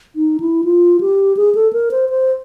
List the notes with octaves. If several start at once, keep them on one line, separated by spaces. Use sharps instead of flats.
D#4
E4
F4
G4
G#4
A4
A#4
C5
C5